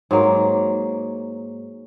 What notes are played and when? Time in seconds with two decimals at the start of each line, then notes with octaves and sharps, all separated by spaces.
0.11 G#2 F#3 A#3